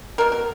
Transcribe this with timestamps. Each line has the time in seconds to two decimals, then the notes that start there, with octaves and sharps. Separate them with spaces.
0.18 B2 A#3 A#4
0.32 A#4